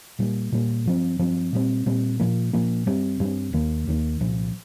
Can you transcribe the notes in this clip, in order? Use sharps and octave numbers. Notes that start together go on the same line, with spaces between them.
A#2 G3 A#3
A#2 G3 A#3
G2 F3 C4
G2 F3 C4
A#2 G3 C4
A#2 G3 C4
A#2 F3 A#3
A#2 F3 A#3
G2 G3 C4
G2 G3 C4
D#2 D#3 A#3
D#2 D#3 A#3
C2 A#2 F3